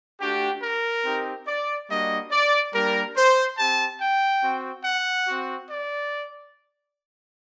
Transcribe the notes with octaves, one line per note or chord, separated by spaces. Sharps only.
A3 D4 F#4 G4
A#4
C4 D#4 G4
D5
G3 A#3 D4 F#4 D#5
D5
G3 A#3 D4 A#4
C5
C4 G4 A5
G5
C4 F#4
F#5
C4 F#4
D5